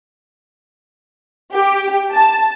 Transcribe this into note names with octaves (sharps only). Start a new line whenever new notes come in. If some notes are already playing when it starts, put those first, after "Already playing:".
G4
A5